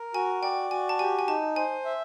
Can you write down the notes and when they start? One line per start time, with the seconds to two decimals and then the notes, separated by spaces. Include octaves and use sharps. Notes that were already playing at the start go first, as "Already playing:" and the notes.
Already playing: A#4
0.14 F#4 G#5
0.42 D5 G5
0.71 F#4 G#5
0.89 A5
0.99 G4 G#5
1.19 G#5
1.28 D#4 A5
1.56 C5 G#5
1.85 E5